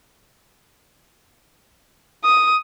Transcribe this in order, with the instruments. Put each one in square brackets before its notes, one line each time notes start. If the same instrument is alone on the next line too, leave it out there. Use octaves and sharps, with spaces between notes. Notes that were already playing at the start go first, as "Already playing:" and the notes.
[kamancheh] D#6